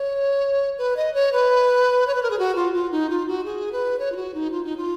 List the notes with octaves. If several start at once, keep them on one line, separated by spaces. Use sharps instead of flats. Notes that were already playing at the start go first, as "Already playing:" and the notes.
Already playing: C#5
B4
D#5
C#5
B4
C#5
B4
A#4
G#4
F#4
F4
F4
D#4
F4
F#4
G#4
B4
C#5
F4
F#4
D#4
F4
D#4
F4